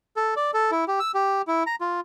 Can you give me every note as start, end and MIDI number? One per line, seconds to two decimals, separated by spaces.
0.16 0.34 69
0.36 0.51 74
0.54 0.71 69
0.71 0.85 64
0.88 1.00 67
1.00 1.12 88
1.14 1.42 67
1.48 1.63 64
1.67 1.75 82
1.81 2.00 65